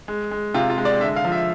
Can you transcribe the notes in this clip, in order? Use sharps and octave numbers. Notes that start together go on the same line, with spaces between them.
G#3
G#3
C3 F4
F4
G#3
D5
D3 E5
F5
F3
E5